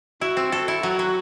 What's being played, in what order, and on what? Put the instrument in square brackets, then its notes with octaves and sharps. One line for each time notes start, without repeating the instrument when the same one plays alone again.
[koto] E4 [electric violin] F#4
[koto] C4
[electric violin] F#4 [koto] A4
[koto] E4
[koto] F#3 [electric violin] F#4
[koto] F#3